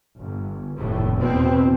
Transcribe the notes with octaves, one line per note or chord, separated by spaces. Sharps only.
G1
F1 D#2 A2
E2 B2 C4